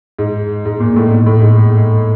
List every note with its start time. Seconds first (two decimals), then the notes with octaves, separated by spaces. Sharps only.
0.19 G#2
0.65 G#2
0.80 A#2
0.96 A2
1.11 B2
1.26 A2
1.42 G#2